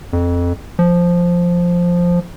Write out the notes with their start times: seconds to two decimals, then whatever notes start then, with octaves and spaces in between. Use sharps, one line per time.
0.13 F2
0.79 F3